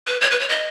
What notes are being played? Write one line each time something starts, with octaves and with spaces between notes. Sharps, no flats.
B4
C#5
B4
C#5
D#5